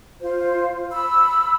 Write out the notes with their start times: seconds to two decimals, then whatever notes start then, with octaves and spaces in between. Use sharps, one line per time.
0.21 F4 C5
0.91 B5 E6